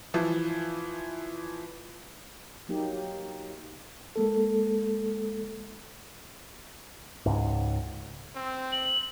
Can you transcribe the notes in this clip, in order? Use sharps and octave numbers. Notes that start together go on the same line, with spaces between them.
E3 F3
F#3 A#3 D#4 G4
G#3 A#3 A4
C#2 G#2
C4
F#7